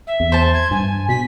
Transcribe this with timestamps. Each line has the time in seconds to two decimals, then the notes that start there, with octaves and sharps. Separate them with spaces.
0.07 E5
0.20 E2
0.32 C5 A5
0.54 G#6
0.71 G2 G#5
1.09 B2 B6